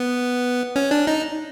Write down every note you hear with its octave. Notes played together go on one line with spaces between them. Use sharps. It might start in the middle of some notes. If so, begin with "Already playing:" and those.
Already playing: B3
C#4
D4
D#4